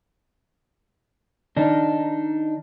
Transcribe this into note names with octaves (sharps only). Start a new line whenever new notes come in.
D#3 D4 D#4